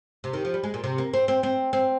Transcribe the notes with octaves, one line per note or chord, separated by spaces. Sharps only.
C3
D#3
F3
G3
G#3
A#2
C3
A#3
C4
C4
C4
C4